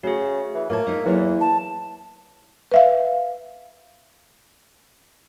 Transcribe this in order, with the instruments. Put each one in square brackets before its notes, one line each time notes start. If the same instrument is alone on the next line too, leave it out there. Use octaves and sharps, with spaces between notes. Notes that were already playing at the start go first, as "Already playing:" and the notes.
[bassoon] C#3 [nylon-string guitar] A3 [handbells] F#4 G#4
[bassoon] E3
[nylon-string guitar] A2 F4 A5 [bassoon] A#3 [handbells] C#5 G#6
[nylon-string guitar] G#3 D#4 A#4 [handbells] E5
[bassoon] E2 [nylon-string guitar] F#3 A#3 A4 [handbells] E4
[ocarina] A5
[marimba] B4 E5 F5